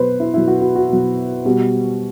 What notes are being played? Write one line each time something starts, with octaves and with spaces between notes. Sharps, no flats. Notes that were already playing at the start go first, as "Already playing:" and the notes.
Already playing: B2 F#3 B4 C5
E4
B2 F#3 E4
F#4
F#4
F#4
B2 F#3
B2 G3 F#4